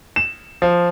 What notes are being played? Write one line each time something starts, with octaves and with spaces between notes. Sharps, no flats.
E7
F3